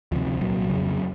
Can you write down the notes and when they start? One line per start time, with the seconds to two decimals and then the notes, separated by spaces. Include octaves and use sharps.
0.12 D2 C3 F3
0.26 F3
0.41 C2 A#2 F#3
0.70 F2 C#3